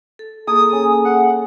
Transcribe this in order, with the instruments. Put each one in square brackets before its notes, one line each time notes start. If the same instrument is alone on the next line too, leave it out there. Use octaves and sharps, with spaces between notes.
[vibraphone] A4
[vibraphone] A#3 G#4 [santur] A4 [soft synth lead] D#6
[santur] C#4
[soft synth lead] F#5